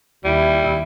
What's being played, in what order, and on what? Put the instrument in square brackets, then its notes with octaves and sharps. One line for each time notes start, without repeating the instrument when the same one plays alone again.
[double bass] D#2 E4 [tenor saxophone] G3